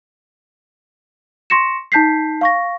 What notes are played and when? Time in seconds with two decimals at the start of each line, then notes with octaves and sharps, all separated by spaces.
1.50 C6 C#6 A#6 C#7 E7
1.92 D#4 A5 G6 B6 C7
2.41 F5 C#6 A#6